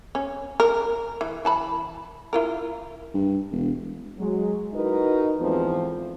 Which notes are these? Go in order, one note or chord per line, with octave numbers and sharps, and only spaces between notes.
C#4
A#4
E3
E3 A5 B5
E4 F4 A#4
G2
E1
F#3 G#3
D#4 E4 F#4 A#4 B4 D#5
E2 G#2 E3 F3 A3 C4